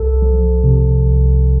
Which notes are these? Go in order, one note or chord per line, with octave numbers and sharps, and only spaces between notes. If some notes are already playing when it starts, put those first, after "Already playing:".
Already playing: C2 A4
F3
C3
C2